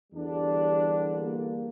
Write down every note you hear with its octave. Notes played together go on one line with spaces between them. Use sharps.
E2 D3 G3 D4
A#3